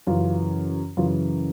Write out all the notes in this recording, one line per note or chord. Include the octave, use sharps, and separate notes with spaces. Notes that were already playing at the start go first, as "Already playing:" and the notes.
F#2 C#3 E3 F4
F#2 C#3 E3 F4